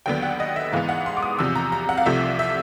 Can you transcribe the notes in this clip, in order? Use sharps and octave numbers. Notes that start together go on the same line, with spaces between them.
D#2 D3 F#3 B3 G5
F#5
D#5
E5
G#2 E3 G#3 B3 F5
F#5
C6
D6
D#6
E2 C3 F3 E6
A#5
A#5
F#5
F5
C2 C3 F3 A3 E5
E5